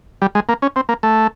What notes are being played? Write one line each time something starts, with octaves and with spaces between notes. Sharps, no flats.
G3
G#3
A#3
C#4
C4
A#3
A3